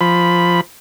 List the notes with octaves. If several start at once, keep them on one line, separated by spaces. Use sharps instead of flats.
F3 B5